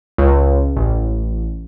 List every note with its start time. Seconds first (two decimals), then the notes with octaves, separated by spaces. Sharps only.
0.18 C#2
0.77 A1